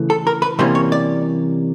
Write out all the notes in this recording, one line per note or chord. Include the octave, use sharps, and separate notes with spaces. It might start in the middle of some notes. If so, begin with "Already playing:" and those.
Already playing: C#3 E3 A3
A4
A#4
B4
C3 E3 G3 A#3 C#4 C5
C#5
D5